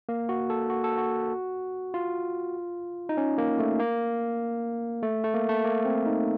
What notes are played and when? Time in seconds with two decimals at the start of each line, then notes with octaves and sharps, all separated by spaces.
0.09 A#3
0.29 F#4
0.50 A4
0.70 F#4
0.84 A4
0.98 F#4
1.94 F4
3.09 D#4
3.17 C#4
3.38 A#3
3.59 A3
3.80 A#3
5.02 A3
5.24 A3
5.34 A#3
5.49 A3
5.65 A#3
5.85 C4
6.06 D#4